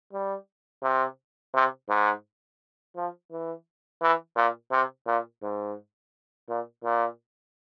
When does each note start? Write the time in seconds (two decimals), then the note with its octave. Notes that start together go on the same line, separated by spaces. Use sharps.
0.13 G3
0.82 C3
1.54 C3
1.89 G#2
2.96 F3
3.31 E3
4.02 E3
4.36 A#2
4.71 C3
5.06 A#2
5.42 G#2
6.49 A#2
6.84 A#2